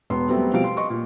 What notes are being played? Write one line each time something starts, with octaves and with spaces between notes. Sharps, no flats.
E1 B3 C6
F#3 G3 A3 B3 C4
B2 F3 G3 C4 F5 D7
C6
D#5 C6 C#6
A#2